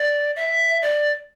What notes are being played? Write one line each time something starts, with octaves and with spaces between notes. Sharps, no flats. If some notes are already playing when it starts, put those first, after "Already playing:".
Already playing: D5
E5
D5